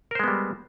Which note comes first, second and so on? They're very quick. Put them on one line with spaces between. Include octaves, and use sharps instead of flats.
A#4 C5 G#3 B3 G3